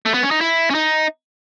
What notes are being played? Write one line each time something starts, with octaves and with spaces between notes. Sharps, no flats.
A3
B3
C#4
D#4
E4
C#4
D#4